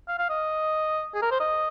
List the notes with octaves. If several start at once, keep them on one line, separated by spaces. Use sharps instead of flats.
F5
F5
D#5
G#4
A#4
C5
D#5